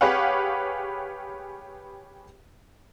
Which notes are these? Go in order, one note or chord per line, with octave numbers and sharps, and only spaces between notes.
G4 G#4 B4 C#5 F5 F#5